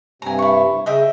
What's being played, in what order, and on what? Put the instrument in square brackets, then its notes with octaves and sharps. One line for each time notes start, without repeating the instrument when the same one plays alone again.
[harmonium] G2 C3 [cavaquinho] G#5 A#5
[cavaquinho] E4 C#6
[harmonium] C#3 [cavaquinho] D#5 E5 G5